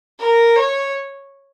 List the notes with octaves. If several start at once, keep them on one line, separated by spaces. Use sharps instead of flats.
A#4
C#5